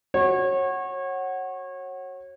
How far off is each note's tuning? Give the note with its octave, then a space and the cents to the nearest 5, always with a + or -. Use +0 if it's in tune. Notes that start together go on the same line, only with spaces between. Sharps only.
F#4 +5 C#5 -30